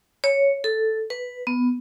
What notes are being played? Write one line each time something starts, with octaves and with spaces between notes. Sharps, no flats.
C#5
A4
B4
B3